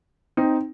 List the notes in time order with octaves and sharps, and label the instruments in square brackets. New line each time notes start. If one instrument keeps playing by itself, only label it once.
[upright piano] C4 D#4